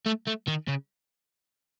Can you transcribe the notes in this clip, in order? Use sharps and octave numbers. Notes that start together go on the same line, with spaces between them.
A3
A3
D#3
C#3